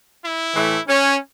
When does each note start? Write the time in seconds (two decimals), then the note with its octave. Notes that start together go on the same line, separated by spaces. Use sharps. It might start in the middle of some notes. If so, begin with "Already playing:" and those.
0.22 E4
0.55 A2 E3 A3
0.87 C#4